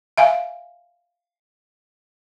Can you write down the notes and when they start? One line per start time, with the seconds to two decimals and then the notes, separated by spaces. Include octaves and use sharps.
0.18 E5 F5 G#5